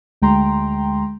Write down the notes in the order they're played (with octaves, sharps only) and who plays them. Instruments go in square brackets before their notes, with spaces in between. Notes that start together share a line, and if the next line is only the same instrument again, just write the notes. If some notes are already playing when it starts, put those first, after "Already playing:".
[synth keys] D2 G#3 G5 A#5 C6